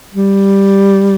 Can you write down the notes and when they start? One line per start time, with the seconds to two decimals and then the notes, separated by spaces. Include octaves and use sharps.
0.14 G3